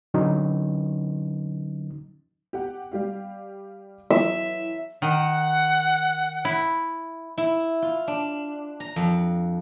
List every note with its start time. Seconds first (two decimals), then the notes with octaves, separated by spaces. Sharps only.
0.14 D3 F#3 C#4 D#4
2.53 G4 F#5
2.91 G3 G4 F5
4.10 E3 F#3 E5
5.02 D#3 F#5
6.45 E4
7.38 E4
7.82 F4
8.08 D4
8.80 A#5
8.96 F2